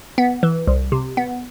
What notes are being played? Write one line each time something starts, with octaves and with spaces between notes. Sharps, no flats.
B3
E3
C2
C3
B3